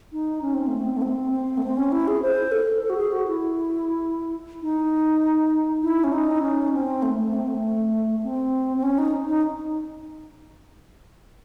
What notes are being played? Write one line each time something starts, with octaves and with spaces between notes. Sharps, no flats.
D#4
C#4
C4
A3
C4
A3
C4
C4
A3
C4
C#4
E4
G#4
C5
A4
A4
F#4
G#4
F#4
E4
D#4
E4
C#4
D#4
C#4
C4
A3
A3
C4
A3
C4
C4
C#4
D#4
D#4